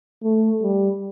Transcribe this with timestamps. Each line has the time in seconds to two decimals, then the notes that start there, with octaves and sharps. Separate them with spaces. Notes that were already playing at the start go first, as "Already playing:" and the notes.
0.23 A3
0.62 G3